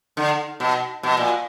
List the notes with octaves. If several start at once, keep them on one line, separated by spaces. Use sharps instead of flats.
D3
B2
B2
A#2